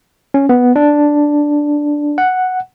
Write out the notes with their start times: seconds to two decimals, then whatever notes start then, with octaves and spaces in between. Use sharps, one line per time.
0.34 C#4
0.49 B3
0.76 D4
2.18 F#5